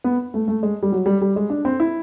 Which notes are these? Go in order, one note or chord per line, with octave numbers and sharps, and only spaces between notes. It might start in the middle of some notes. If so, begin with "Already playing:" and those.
B3
A3
A3
G#3
G3
F#3
G3
G3
G#3
D4
C4
E4